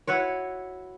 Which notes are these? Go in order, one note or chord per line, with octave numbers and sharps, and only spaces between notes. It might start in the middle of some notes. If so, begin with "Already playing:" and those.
E4 F#4 B4 C#5